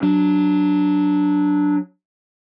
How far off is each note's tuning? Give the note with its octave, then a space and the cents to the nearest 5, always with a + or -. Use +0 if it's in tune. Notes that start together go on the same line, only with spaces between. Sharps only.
F#3 +0 D4 +0